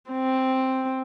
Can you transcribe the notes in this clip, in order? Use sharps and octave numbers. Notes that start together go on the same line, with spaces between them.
C4